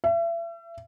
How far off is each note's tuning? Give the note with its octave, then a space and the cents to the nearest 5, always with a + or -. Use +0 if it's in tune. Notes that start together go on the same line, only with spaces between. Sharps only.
E5 +35